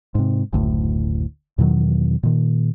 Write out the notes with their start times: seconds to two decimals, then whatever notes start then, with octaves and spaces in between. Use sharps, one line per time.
0.15 G#2 C3
0.53 F#1 D2 A2
1.58 E2 B2 D#3 F#3
2.23 A#2 D#3